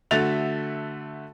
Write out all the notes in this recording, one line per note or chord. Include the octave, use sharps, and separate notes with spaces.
D3 A3 F#4 E5 A6 F7